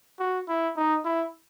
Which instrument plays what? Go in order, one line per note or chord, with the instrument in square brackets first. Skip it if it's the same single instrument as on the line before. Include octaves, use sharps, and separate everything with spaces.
[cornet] F#4
E4
D#4
E4